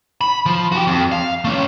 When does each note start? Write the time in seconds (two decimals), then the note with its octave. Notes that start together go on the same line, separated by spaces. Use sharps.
0.21 B5
0.46 F3
0.72 F#4 G4
0.87 F2
1.12 F5
1.45 A3 C#4